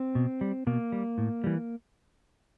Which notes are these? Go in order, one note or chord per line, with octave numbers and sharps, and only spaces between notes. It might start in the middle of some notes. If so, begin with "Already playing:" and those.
Already playing: C4
B2
G3
B2 A#3
G3
A2
E3 G3